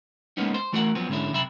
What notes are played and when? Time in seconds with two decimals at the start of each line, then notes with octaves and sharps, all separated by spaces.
0.37 G#3 A#3 B3 C#4 D#4
0.54 C5
0.73 E3 A3 F#4 A#4 E5 F#5
0.95 F3 F#3 B3 C4
1.09 G#2 D3 G#3 C#4 E4
1.32 F#2 C3 E5 B5